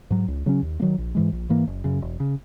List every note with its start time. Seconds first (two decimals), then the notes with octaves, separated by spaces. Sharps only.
0.10 G#2 F#3
0.28 C#2
0.46 C#3 F#3 C#4
0.62 D#2
0.80 A#3
0.82 D#3 F#3
0.98 A#1
1.15 G#2 E3 G#3
1.32 A#1
1.49 G#2 E3 A#3
1.67 F#1
1.84 F#2 C#3
2.02 E1
2.20 C#3